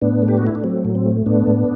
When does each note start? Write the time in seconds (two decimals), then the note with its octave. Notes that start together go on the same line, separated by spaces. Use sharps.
0.02 A2 B3 D4
0.22 A3
0.28 G4
0.38 F#4
0.43 A3 E4
0.55 D4
0.64 F#3 C4
0.85 A2
0.95 C4
1.06 A3
1.26 A2 B3 D4
1.47 A2